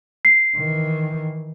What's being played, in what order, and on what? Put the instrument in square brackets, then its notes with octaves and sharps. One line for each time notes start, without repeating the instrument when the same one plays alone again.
[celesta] C7
[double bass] D#3 E3